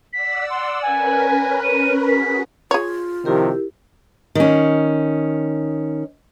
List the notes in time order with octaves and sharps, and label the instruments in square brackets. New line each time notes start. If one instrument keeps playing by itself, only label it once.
[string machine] D5 F#5 E6 [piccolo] B6
[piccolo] C6
[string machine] C#4 A#4 B4 [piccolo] G#5
[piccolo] D#7
[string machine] F#4 G#4 [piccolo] B6
[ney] F4 [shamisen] G#4 C#5
[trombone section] C3 D#3 F3 [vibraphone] E4 G4 A#4
[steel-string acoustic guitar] D#3 C#4